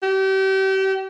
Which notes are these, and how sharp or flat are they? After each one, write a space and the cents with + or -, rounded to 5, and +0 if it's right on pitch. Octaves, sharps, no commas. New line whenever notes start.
G4 -35